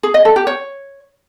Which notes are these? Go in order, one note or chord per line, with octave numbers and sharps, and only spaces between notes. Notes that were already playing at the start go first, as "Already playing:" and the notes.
G#4
D#5
A4
G4
C#5